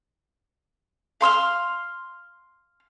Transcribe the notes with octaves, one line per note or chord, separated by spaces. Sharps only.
F5 C6 E6 F6